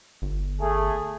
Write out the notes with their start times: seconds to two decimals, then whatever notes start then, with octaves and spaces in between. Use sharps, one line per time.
0.22 G1
0.61 A3 G#4